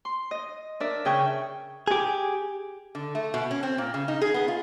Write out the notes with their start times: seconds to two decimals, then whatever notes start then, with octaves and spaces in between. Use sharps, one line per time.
0.05 C6
0.31 D#5
0.80 D4 A#4 D5 E5
1.05 C#3 G#4 E5 G5 C#6 G6
1.88 G4 G#4
2.95 D3
3.15 A3
3.34 B2
3.51 C#4
3.63 C4
3.78 A#2
3.94 C#3
4.08 D#4
4.21 G#4
4.34 B3
4.48 F4